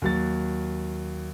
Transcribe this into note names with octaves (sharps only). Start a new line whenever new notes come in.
D#2 F#3 A6